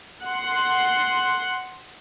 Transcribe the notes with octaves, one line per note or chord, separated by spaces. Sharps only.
F#5 C6